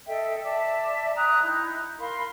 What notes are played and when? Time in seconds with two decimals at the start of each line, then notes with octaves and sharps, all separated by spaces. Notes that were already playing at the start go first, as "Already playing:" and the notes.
0.07 A4 D#5 E5 G5
0.43 D5 E5 A5 D6
1.15 G5 A#5 D#6 F#6
1.44 D#4 E4
1.99 A#4 F5 B5 C6